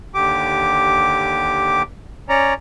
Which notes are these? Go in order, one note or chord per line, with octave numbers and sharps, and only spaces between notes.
D#2 D3 G4 D6
C#4 C#5 D5 A#5